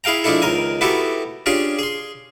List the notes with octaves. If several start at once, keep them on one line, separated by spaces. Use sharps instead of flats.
E4 G#4 F5 G5 A#5
F3 G#3 A3 D4 E4 A4
C#2 D#3 A#4 G#5
A3 B3 E4 F#4 G4 A4
C#4 D4 F4 G4 G#4
G#4 C6